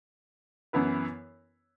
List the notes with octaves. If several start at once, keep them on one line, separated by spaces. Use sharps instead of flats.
F#2 E3 B3 E4 B4